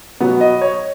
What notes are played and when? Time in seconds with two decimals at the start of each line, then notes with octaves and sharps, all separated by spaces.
0.20 B2 F#3 B3
0.41 D#5
0.61 C#5